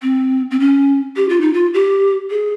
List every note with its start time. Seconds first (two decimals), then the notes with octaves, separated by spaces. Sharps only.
0.02 C4
0.51 C4
0.60 C#4
1.16 G4
1.29 F4
1.41 D#4
1.53 F4
1.74 G4
2.30 G#4